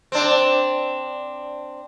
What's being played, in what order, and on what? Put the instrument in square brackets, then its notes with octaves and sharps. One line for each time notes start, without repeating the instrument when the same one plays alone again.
[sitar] C4 D4